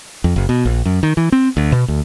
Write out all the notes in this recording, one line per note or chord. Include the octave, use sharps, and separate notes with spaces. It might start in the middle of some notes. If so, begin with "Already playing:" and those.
F2
F#1
B2
A#1
F#2
D#3
E3
C4
D2
B2
D2